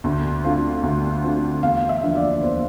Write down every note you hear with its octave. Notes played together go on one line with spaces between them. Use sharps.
D2
D3 A3 C4 F4
D2
D3 A3 C4 F4
E2 F5
E5
D3 F3 A#3
D5
E2 C5